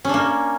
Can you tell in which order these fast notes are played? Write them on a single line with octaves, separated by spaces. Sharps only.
C#4 D4 A#3